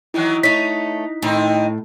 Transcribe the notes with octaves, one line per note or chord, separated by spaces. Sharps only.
D#3 E3 F#3 E4 F#6
A3 D#4 C#5 B6
A2 D#3 C4 D#4